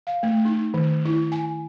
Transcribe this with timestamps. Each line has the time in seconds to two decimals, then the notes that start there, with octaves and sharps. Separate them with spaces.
0.07 F5
0.23 A3
0.45 D#4
0.74 D#3
1.05 E4
1.32 G#5